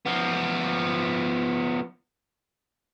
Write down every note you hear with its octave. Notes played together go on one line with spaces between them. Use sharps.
F3 B3